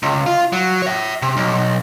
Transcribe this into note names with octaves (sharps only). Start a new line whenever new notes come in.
C#2
F4
F#3
C#5 E5
C3
B1